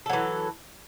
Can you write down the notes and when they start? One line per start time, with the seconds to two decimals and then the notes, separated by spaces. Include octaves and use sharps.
0.06 A4
0.10 F#3
0.13 E3